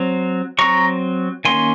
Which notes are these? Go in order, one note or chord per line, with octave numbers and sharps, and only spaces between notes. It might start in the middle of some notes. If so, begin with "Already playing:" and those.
Already playing: F#3 C4
F#3 C4 A#5 C#6
D#3 A#3 C#4 G#5 C6